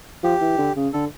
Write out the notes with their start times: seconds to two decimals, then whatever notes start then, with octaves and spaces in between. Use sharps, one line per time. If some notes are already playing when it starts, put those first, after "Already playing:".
0.23 F3 G4
0.41 E3
0.58 D3
0.76 C#3
0.93 D3 A4